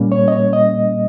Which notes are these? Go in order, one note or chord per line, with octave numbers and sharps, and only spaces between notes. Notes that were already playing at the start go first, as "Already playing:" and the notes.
Already playing: A#2 G3 A#3 C#4
C#5
D#5
C#5
D#5